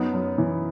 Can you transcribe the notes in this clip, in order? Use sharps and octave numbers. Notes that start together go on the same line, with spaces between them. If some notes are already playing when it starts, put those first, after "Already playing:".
Already playing: F#2 B3 D#4
F#2
E3